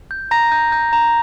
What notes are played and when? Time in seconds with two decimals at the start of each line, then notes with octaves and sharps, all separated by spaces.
0.11 G6
0.31 A#5 A#6
0.52 G6
0.72 G6
0.93 A#5